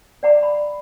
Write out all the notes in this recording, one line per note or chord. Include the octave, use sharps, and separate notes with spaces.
D5 F#5 A#5 D6
B5